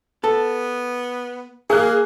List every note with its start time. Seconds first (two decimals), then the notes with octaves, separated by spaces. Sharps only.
0.24 B3 A4
1.70 A#3 G#4 F#6